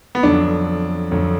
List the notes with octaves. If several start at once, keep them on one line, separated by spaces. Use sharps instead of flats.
B3
F2 D3 F#3 D4
F2 D3 F#3